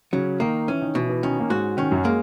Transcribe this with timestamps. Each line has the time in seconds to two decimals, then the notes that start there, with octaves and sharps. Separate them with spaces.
0.13 C#3 F#3 C#4
0.40 D#3 A#3 D#4
0.68 E3 C#4 E4
0.81 D#3 D#4
0.95 B2 E3 E4
1.09 E3 E4
1.22 D#3 C#4 D#4
1.40 A#3
1.49 G#2 G#3 F#4
1.77 D#3 C#4
1.91 F#2 F#3
2.05 G#3 A#3